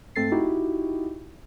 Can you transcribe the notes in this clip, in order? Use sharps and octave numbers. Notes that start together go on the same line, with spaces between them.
G#2 A3 C4 A4 A6 C7
D#4 E4 F#4 G4